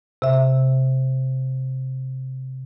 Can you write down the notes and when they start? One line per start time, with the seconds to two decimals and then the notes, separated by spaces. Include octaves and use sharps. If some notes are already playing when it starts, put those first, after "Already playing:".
0.22 C3 E5